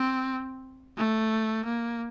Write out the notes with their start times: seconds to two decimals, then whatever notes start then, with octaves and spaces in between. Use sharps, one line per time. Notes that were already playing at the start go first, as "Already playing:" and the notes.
Already playing: C4
0.98 A3
1.65 A#3